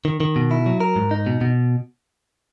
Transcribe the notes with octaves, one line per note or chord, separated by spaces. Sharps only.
D#3
D#3
B2
E4
F#3
A#4
G#2
D#4
B2
B2